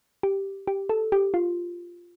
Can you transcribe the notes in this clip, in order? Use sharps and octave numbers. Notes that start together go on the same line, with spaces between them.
G4
G4
A4
G4
F4